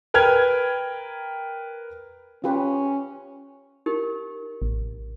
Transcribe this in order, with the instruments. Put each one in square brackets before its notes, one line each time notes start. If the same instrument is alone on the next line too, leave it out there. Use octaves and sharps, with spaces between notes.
[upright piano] A#4 B4 G5 F6 G#6
[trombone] C#4 [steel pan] F4 G4 B4
[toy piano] D#4 G4 A#4
[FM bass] A1